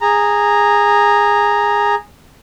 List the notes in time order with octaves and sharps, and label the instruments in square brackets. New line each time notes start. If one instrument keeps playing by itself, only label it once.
[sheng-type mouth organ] G#4 A#5